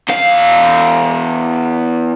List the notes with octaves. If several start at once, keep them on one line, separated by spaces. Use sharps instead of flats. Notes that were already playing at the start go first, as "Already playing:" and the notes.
E2 F5